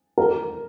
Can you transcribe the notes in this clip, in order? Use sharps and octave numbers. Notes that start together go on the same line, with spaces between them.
A#4